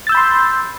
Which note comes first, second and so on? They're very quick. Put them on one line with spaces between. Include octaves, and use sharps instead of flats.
A6 E6 G6 B5 C6